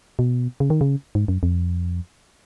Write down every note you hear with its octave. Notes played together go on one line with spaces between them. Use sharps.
B2
C#3
D#3
C#3
G#2
F#2
F2